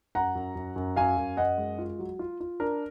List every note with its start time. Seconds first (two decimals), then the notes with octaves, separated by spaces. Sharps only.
0.15 F#2 F#5 A#5
0.35 F#2
0.55 F#2
0.76 F#2
0.96 F#2 F5 G#5
1.18 F#2
1.37 F#2 D#5 F#5
1.58 G#3
1.78 F4
1.99 F#3
2.19 F4
2.40 F4
2.60 D4 A#4